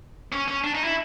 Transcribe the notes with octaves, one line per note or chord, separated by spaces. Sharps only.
C#4
C#4
D4
D#4
E4